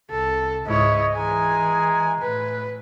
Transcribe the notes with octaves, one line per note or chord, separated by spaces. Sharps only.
C2 A4
C#2 G#2 E4 C#5 D#5
E3 G#3 G#4 G#5 A#5
A2 B4